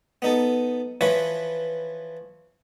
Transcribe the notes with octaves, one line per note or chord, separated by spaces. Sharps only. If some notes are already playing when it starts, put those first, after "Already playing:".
B3 D#4 A4
E3 F3 E4 B4 C#5